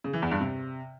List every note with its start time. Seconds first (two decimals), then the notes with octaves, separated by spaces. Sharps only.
0.04 C#3
0.13 E3
0.22 E2
0.31 G2
0.40 C3